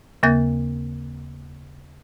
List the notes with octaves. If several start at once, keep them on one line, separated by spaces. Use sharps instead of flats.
D#2 C#3 A#3 G6 A6